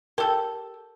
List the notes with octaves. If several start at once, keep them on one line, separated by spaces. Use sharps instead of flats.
G4 A4 A#4